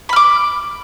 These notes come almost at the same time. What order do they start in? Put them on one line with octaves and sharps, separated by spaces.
B5 F6 D6